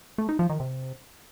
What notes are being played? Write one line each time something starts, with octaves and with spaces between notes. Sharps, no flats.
A3
D#4
F3
D#3
C3